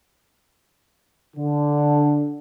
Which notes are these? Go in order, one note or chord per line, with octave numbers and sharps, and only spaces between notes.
D3